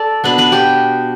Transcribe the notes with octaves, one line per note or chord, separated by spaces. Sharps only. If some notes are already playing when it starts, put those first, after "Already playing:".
Already playing: A4 D5 A5
B2 B3 D4 B4 B5
B4 B5
G4 G5